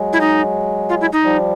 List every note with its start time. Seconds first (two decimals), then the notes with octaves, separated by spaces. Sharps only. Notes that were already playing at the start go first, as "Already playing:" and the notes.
Already playing: F#3 G#3
0.13 E4
0.21 D#4
0.89 F4
1.01 E4
1.13 D#4
1.24 F3 G3